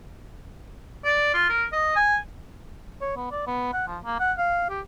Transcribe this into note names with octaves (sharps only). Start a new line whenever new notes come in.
D5
F4
A#4
D#5
G#5
C#5
B3
D5
B3
F#5
F3
A#3
F#5
F5
G4